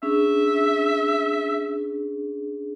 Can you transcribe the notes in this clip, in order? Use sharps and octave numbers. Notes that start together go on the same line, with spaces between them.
C#4 D4 G#4 E5